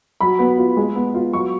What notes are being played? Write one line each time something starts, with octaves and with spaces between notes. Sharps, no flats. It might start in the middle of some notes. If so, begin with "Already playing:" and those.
F#3 B5
B3
F4
G#3
B3
F4
F#3 C#6